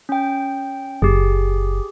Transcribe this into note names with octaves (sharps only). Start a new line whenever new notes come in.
C#4 G5
F#1 G4 G#4